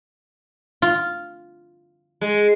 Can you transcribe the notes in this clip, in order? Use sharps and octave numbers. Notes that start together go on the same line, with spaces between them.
F4
G#3